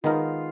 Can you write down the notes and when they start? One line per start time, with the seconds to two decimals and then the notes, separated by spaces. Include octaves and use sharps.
0.03 D#3 G#3 B3 D#4 F4 A#4